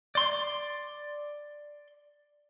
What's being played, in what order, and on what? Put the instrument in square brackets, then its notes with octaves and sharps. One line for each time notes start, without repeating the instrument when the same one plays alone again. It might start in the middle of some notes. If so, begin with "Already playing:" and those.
[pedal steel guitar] D5 C6